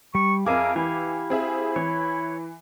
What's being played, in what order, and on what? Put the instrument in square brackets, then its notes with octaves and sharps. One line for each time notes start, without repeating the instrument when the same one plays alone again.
[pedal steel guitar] G3 [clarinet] C#6
[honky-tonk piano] F2 A#4 D6 [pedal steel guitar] G#4 E5 G#5 [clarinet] F5
[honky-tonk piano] E3 [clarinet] E4 [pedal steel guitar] G4 F5 G#5
[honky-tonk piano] C4 G#4 E5
[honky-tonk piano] E3 [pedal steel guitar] C#5